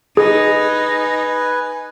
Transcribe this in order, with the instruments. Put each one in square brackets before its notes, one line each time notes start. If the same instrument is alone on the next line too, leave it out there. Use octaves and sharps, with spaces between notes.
[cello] D#4 [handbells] G#4 [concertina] B4 G#5